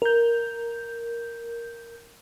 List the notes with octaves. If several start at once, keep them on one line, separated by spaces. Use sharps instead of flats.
A#4 G6